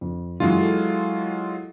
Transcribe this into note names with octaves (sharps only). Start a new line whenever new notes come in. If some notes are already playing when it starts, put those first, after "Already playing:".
F2
F#2 E3 F#3 G#3 F4
E4 A4